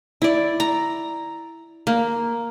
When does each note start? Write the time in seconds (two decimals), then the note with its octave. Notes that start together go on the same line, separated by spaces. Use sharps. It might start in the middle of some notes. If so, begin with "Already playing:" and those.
0.22 E4 D5
0.60 A#5
1.87 A#3